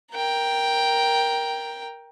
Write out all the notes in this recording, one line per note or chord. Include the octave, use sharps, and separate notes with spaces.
A#4 G5